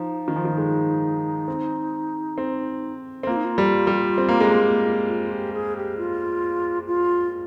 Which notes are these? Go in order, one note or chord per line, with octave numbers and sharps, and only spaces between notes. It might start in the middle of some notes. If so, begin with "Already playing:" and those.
Already playing: F3 D#4
D#3
F3
D#3
G#3
C4
C4
C4
A#3 F4
D#4
F4
G3
G3
C4
A#3
G#3
A#3
F4
G4
G#4
G4
F4
F4